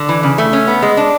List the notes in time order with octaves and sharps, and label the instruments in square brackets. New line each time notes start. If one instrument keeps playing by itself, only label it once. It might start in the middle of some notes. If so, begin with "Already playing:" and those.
Already playing: [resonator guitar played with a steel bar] D3
E3
C#3
A3
C#4
B3
G#3
D4